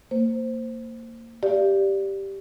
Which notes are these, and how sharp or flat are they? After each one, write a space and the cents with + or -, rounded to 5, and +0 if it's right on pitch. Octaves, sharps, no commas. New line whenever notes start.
A#3 -25 C5 +0
G4 +0 D5 +0 F5 -45